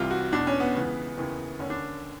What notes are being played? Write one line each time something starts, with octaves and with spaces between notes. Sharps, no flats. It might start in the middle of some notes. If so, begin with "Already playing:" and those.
Already playing: C2 C3 E3 F4
F#4
E2 B2 D4
C#4
B3
C#2 C#3 E3
D#2 C#3 E3
D#2 D3 C#4
D4